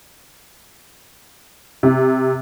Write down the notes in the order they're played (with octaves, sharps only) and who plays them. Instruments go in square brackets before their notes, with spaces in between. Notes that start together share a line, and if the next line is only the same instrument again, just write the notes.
[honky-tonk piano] C3